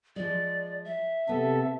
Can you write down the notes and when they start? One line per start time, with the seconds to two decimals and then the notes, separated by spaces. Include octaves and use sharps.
0.16 F3 G#3 D5
0.85 E5
1.29 C3 B3 A4